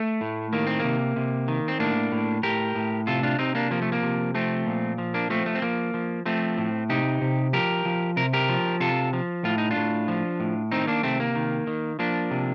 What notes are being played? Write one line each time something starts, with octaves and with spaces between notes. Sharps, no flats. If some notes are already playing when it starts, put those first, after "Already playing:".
Already playing: A3
A2
D#3 A#3
C4
C3 A#3
C3
D#3
C4
A2 A#3 D4
A2
A2 G4 A#4
A2
C3 F4 A4
D4 F4
C3 C4 D#4
A#3 D4
F3 A#3
A3
A#3
C3
F3 A3 C4
A#2
F3
A#3 D4
F3 A3 C4
A3
C4
F3 A#3
F3
F3 A3 C4
A2
C3 D#4 G4
C3
F3 G4 A#4
F3
C3 A#4
G4 A#4
F3
C3 F4 A4
F3
A2 F4
D#4
D4 F4
A2
F3
A2
D#3 C4 D#4
A#3 D4
C3 A3 C4
A#3
D#3
D#3
F3 A#3 D4
C3